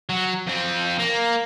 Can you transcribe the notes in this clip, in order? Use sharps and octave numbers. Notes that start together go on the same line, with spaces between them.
F#3
F2 C4
A#3